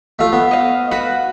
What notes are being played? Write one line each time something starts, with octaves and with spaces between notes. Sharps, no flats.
A3 F4
B3
D#5 F5
F#4 B4